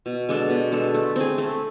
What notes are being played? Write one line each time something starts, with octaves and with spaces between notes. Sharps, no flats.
B2
G#3 D4 A4
B2
G#3 D4 A4
A3
C4 G#4
A3